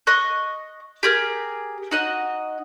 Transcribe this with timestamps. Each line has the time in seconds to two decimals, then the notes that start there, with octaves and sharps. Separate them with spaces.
0.07 D#5 C#6 F#6
1.03 G4 G#4 A#4
1.91 D#4 F#4 D#5